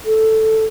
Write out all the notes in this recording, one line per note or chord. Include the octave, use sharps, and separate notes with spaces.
A4